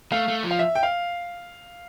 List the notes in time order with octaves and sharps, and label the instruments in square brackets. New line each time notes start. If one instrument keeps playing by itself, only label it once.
[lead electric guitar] A3 [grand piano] F5
[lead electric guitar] A3
F3
[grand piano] F5
E5
G5
F5